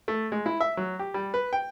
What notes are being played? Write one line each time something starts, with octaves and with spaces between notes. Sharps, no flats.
A3
G#3
E4
E5
F#3
G4
G3
B4
G5